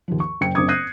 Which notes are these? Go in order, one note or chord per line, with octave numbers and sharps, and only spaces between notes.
D#2 F3
C#6
F#1 G5 C#7
F#1 C4 D4 D6 D#6 G#6
D#6 F#6 G6 A#6 C7 D#7